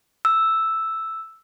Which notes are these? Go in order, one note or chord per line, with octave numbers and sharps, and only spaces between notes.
E6